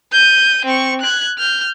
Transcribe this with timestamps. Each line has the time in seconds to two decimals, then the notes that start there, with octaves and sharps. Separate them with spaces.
0.12 G6 D#7
0.65 C4 C#6
1.01 F#6 G#6
1.38 F6 G6